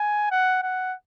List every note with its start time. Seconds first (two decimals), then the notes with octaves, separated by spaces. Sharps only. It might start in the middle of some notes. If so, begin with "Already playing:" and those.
Already playing: G#5
0.31 F#5
0.62 F#5